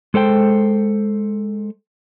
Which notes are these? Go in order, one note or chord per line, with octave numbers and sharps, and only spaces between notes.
G#3 A4 C5 G5